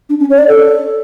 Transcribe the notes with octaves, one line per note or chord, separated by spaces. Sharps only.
D4
C#4
C#5
D5
A4